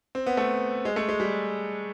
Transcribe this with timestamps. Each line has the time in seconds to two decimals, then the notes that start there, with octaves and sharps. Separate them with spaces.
0.15 C4
0.26 B3
0.37 A3
0.85 G#3
0.96 A3
1.09 G#3
1.20 G3